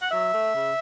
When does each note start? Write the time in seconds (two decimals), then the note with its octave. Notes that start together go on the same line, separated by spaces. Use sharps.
0.01 F#5
0.10 F#3 E5
0.32 A3
0.53 C#3